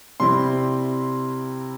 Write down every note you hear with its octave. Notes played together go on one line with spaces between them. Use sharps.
C3 G3 C4 E4 C6